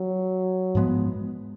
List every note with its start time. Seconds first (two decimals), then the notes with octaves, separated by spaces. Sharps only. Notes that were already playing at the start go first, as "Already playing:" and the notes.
Already playing: F#3
0.75 G#2 F3 G#3 B3